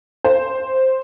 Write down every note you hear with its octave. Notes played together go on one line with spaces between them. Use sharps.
C5